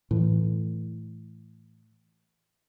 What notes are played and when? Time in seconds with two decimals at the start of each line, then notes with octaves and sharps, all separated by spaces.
0.11 A2 E3